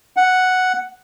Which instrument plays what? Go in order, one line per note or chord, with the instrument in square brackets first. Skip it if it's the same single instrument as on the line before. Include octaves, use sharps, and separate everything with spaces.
[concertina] F#5